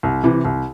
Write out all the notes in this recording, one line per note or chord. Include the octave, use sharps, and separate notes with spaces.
C2
C3 E3
C2